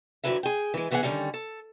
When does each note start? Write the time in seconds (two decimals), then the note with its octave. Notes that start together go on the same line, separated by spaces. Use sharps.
0.24 F2 D3 F#3 E4 B4 E5
0.43 G#4 G5
0.74 E3 G#3
0.91 G2 E3 B3 F#4 G#4 F#5
1.03 D3 D#3 G3 C#4 D#4
1.34 A4